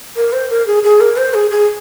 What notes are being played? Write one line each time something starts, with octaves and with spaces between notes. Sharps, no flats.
A#4
C5
A#4
G#4
G#4
A#4
C5
G#4
G#4